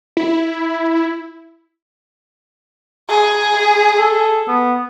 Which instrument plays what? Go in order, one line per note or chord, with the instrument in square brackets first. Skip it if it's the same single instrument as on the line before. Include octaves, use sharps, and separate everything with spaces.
[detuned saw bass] E4
[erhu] G#4
[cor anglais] A4
B3